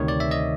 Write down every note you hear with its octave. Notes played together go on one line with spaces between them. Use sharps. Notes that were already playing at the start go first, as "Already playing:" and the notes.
Already playing: D2 C3 D#3 C#5
D5
E5
D#5